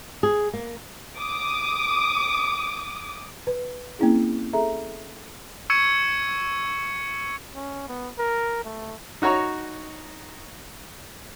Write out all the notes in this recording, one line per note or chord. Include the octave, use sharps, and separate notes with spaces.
G#4
A#3
D6 D#6
B4
A#3 C4 C#4 E4 G#4
G#4 A4 E5 A#5
C#6 E6 G#6 C#7 D#7
C#4
B3
A#4
A3
D#4 F#4 C#5 A#5 C#6